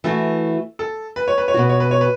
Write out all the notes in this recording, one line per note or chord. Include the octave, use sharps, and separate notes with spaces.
E3 A3 F#4 A4
A4
B4
C#5
B4
C#5
B2 B3 F#4 B4
C#5
B4
C#5
B4